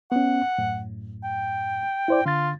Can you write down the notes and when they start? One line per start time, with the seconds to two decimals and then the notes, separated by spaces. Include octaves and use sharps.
0.12 B3 C#4 F#5
0.59 F#2 A2
1.24 G5
2.08 E4 C5 D5
2.26 D3 F4 A6